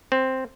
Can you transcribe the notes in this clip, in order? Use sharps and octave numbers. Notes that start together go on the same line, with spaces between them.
C4